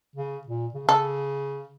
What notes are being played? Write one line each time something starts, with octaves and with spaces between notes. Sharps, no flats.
C#3
A#2
C#3
C#3 A4